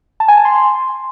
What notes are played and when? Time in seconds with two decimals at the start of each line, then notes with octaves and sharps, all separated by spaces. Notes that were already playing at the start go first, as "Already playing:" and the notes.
0.20 A5
0.28 G#5
0.37 A5
0.45 C6